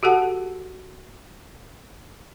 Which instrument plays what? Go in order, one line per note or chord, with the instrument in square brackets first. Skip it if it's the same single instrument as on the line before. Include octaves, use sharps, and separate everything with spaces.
[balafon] F#4 G4 A4 F#5 A5